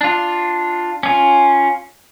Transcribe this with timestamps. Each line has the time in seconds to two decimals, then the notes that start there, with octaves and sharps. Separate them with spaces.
0.01 D4 F4
1.03 C#4 F4